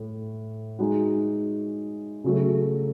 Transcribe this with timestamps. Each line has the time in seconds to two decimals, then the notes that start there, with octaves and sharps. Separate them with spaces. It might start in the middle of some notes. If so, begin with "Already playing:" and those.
Already playing: A2 A3
0.79 G#3 D#4 F#4
2.24 C#3 F#3 A3